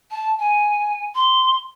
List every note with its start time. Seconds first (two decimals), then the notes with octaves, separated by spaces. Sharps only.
0.11 A5
0.39 G#5
1.15 C6